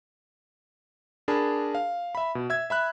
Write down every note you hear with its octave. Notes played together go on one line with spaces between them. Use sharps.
D4 G#4 A#4 A5 B5
F5
E5 B5
B2
E5 E6 G#6
E5 B5 F#6